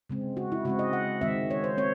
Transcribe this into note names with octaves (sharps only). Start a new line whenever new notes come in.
C#3 G#3 C4
F#4
E4
C#3 G#3 C4 F#4
D#5
F#5
D#3 G#3 C4 E5
C#5
C5
C4 C#5